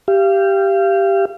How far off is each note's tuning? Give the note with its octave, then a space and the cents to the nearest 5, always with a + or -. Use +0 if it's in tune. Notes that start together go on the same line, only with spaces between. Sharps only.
G4 +0 F5 -30